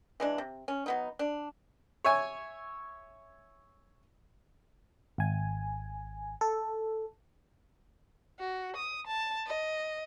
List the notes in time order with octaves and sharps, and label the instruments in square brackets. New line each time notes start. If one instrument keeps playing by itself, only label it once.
[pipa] E3 G#3 D4
C3
C#4
F#3 B3 D#4
D4
[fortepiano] C#5 E5 G#5
[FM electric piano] G#1 G#5
A4
[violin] F#4
D#6
A5
D#5